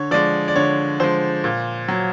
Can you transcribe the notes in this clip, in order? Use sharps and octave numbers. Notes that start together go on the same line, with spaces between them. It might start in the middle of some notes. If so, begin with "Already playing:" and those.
Already playing: D3 C#5
F3 G#3 D5
D5
D3 C#5
F3 G#3 C5
A#2
F#3